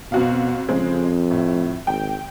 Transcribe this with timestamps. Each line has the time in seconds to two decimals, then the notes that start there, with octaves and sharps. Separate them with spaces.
0.12 F2 B2 F#4 F5
0.69 F2 C#3 G#3 C4
1.31 A2
1.87 G#1 G5